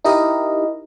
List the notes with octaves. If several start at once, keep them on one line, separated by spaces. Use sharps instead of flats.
D#4 E4 G4 A#4 D#5